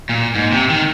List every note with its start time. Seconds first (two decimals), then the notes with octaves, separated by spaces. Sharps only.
0.09 A#2
0.35 G#2
0.52 C3
0.70 D#3